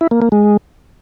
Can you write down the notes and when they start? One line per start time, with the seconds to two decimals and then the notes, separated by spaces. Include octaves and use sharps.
0.01 E4
0.11 A#3
0.22 A#3
0.32 G#3